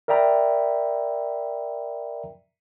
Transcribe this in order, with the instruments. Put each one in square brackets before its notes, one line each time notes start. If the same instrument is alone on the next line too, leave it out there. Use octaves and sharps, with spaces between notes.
[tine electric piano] A#4 D5 E5 G5 A#5 B5